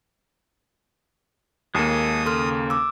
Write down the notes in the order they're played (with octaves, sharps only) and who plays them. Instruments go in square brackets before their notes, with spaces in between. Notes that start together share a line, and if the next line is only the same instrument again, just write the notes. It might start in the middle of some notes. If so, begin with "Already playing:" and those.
[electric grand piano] D#2 A#3 [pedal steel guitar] G#3 G#4 A4 [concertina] D#6
[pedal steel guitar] C#3 [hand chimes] A4 C6 F6
[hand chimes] D6 E6